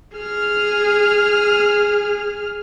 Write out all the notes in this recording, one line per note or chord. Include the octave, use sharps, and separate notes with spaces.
G#4 F6